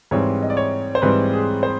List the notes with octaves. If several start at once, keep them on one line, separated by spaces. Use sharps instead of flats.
G#2 E3 G3 C4 C#5
D#5
D5
C#5
C5
G#2 E3 G3 C4 B4
G#4
C5